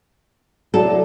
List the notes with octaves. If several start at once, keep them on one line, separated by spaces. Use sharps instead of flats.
A2 C3 F#3 A4 D5